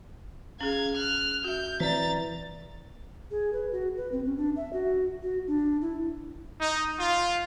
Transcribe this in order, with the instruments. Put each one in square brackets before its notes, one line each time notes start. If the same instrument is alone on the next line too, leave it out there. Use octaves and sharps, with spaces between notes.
[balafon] C#4 G#4 [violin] F5 G#6
[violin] F6 F#6
[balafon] F#4 E5 [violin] G6
[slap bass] E3 [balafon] C4 D5 [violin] A#5 A6
[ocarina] G#4
B4
F#4
B4
C4
C#4
D4
E5
F#4
F#4
D4
E4
[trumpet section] D#4
F4